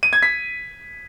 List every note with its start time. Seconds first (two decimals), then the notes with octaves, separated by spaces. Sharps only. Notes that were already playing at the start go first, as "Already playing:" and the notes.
0.03 D#7
0.13 G#6
0.23 B6